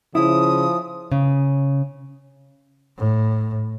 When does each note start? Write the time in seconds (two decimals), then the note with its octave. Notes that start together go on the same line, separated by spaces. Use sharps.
0.15 C#3 F3 E4 D#6
1.12 C#3
2.98 A2